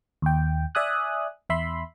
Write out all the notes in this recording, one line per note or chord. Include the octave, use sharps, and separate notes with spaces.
D#2 G5
D5 E5 G#5 D#6 F#6
E2 E5 B5 C6